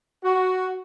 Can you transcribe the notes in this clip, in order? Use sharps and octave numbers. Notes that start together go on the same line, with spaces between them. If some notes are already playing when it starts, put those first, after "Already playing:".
F#4